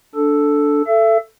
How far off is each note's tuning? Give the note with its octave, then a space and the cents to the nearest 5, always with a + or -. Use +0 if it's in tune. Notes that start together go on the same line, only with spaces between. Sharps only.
D4 -10 A4 +0
A4 +0 E5 +35